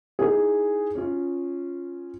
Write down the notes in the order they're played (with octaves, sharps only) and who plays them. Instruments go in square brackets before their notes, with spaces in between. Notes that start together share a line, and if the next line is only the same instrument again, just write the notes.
[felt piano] D#4 E4 G#4
C#4 F4